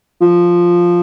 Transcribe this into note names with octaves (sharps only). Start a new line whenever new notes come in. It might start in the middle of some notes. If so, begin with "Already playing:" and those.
F3